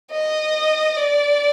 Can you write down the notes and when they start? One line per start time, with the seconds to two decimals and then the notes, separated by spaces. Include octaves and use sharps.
0.12 D#5
0.97 D5